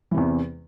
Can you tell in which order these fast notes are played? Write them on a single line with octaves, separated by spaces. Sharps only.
E3 C3 E2